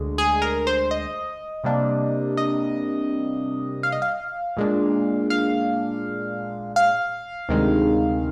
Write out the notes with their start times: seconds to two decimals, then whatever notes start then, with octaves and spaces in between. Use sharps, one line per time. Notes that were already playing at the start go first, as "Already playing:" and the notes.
Already playing: D2 D3 G#3
0.18 G#4
0.42 A#4
0.67 C5
0.91 D#5
1.64 C3 G3 A#3 D4
2.37 D#5
3.83 F5
3.92 D#5
4.02 F5
4.57 A#2 G#3 D4
5.30 F5
6.76 F5
7.49 D2 C3 D#3 G#3